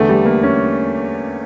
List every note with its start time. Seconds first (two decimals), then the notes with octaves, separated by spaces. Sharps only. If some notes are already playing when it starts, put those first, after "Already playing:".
Already playing: E2 D3 A3
0.09 G3
0.25 A#3
0.43 C#4